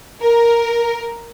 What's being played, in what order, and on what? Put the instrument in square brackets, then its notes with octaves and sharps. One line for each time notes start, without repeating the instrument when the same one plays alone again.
[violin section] A#4